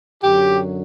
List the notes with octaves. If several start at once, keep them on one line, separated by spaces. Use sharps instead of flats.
F#2 D3 F#3 G4